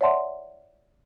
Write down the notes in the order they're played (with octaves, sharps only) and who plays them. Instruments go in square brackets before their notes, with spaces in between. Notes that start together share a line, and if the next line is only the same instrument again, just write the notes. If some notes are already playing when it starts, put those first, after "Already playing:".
[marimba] C#5 D5 E5 F#5 A5 C6